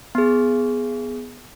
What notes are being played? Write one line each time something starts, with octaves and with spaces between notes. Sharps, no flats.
B3 G#4